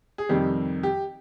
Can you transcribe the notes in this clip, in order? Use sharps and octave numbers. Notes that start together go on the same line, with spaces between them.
G#4
F2 C3 D#3 G3 G4
G4